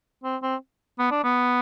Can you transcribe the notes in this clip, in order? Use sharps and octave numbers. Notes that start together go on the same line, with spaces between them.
C4
C4
B3
D4
B3